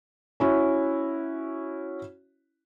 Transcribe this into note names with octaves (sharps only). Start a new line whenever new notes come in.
C#4 E4 F#4